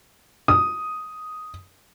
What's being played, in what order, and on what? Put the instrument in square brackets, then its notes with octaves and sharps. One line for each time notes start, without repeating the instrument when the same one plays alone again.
[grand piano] D#6